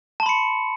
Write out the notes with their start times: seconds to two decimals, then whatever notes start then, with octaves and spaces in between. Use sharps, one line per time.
0.20 A5
0.23 C6
0.26 B5
0.29 C#7